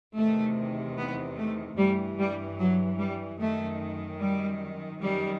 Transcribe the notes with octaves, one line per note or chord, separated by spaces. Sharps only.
E2 C3 D#3 A3
B3
A3
G2 E3 G3
G3
F#3
G3
F#2 D#3 A3
G3
F#2 D#3 G3